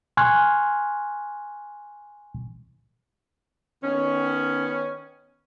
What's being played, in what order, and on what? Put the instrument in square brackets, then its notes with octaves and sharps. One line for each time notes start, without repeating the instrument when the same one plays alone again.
[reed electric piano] G#5 C6 C#6 F6 F#6 G#6
[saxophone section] D#3 B3 C#4